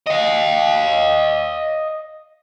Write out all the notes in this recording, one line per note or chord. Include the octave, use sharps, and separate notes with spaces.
D#5 F5